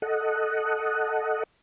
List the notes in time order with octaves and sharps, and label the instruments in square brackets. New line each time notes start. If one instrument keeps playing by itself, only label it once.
[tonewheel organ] A4 D#5 F#5